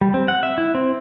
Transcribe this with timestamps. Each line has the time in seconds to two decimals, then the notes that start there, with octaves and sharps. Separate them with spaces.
0.01 G3
0.14 C4
0.28 F#5
0.43 E5
0.58 E4
0.75 C4